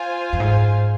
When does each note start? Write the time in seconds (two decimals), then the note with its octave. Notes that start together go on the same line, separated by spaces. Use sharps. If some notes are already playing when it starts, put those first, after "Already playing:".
Already playing: F4 C5 G#5
0.33 F2
0.40 G#2